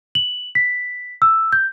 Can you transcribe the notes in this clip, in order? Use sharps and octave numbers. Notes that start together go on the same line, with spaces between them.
F#7
B6
E6
G6